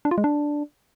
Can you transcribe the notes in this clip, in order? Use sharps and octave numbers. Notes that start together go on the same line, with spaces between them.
D4
F4
G#3
D4